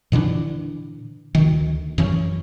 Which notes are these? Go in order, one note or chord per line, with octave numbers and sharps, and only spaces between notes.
A#2 D3 E3 D4
D2 D#3
F#2 E3 C#4